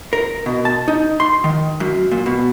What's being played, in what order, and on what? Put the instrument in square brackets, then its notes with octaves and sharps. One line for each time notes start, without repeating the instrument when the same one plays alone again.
[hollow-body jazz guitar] A#4
B2
A5
D#4
C6
D#3
F#2
A#2
B2